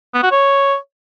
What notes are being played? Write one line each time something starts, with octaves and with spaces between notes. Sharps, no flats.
B3
F#4
C#5